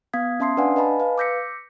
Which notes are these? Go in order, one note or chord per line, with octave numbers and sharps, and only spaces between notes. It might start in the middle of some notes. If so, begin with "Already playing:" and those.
B3 F5 D#6 G#6 B6
C#4 E5 A5 C6 D#6 C7
D4 B4 D5 F5 F#5 G#5
B4 D#5 G#5 A5 B5
B4 F5
D6 E6 G6 A#6 B6 C#7